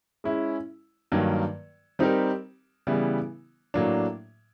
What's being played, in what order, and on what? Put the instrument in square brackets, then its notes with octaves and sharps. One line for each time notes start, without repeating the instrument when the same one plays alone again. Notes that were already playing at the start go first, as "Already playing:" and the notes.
[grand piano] G#3 C#4 E4
G2 D#3 F#3 A#3
G3 C4 D#4 G4 A#4
C#3 E3 G3 B3 E4
A2 F#3 A#3 D4